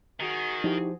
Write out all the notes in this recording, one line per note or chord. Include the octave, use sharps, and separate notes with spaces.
D#3 F#4 G#4
F3 D#4 E4 G4